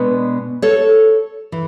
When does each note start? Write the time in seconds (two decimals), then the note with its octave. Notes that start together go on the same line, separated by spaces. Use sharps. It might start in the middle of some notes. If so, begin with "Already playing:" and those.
Already playing: B2 G#3 B3 D4
0.62 A4 C#5
1.52 E3